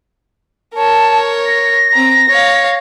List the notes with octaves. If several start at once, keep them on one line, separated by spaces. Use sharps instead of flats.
A#4 C#5 A5
A#6
C4 A#5
C#5 F5